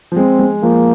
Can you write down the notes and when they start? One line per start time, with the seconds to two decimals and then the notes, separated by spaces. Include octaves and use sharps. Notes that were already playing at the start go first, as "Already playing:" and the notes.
0.12 F3
0.16 G#3 C4
0.39 G#3
0.62 F3 A#3